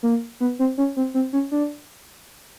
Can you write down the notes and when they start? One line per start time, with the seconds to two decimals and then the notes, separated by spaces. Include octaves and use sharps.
0.03 A#3
0.40 B3
0.59 C4
0.78 C#4
0.97 C4
1.14 C4
1.33 C#4
1.51 D4